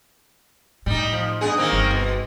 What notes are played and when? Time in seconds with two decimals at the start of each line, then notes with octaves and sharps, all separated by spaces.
0.86 A2 G3 D#4
1.13 F3
1.41 G2 B3 G#4
1.58 D#3 A#3 C4
1.72 G1
1.91 B2